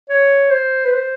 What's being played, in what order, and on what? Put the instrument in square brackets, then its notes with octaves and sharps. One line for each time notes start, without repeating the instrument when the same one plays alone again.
[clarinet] C#5
C5
B4
C5